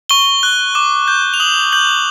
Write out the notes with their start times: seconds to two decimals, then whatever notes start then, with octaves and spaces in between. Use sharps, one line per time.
0.10 C#6 G7
0.43 F#6
0.75 D6
1.08 G6
1.34 F7
1.40 D#6 F#7
1.72 G6 F#7